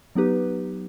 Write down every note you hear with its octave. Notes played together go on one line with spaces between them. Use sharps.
F#3 B3 D#4 G4 B4